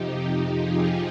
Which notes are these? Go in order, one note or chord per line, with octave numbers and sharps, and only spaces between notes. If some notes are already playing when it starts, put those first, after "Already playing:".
Already playing: F2 C3 F3 D#4 G4
F4 G#4